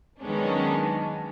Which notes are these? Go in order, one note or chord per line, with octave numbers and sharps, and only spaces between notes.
D#3 F#3 G#3 B3 C#4 D4